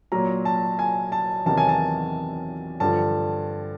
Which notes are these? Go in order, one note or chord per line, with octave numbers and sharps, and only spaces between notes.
A#2 F#3 A#5
A5
G#5
A5
E2 C3 D#3 F#3 A5
G#5
A5
G2 D3 F3 A5